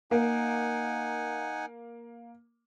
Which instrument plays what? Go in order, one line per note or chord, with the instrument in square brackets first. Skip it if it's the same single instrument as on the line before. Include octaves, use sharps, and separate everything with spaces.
[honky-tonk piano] A#3 [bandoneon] D#4 F#5 G#5